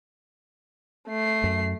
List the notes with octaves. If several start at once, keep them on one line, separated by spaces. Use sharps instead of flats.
A3 C7
F#2